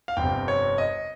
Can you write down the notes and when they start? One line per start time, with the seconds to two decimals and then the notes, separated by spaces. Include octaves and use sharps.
0.08 F5
0.17 G1 F2 C3 G5
0.48 C#5
0.78 D#5